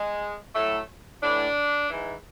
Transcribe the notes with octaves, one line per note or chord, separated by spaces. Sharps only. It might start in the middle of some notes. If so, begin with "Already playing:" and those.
Already playing: G#3
A2 F#3 A3
A2 E3 D4
G#2 E3